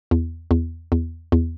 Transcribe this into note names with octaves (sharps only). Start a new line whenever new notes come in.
E2
E2
E2
E2